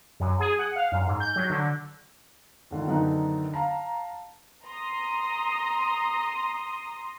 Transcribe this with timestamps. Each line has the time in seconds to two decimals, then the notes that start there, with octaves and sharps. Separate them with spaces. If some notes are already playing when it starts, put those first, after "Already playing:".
0.20 F#2
0.40 G#4
0.59 F#5
0.76 F5
0.92 F#2
1.07 G#2
1.20 G6
1.36 F#3
1.50 D3
2.71 C#2 D3 D#3
2.87 F#2 D3 D#3 B3 D4 D#4
3.54 F5 A5 A#5
4.65 A#5 C6 D#6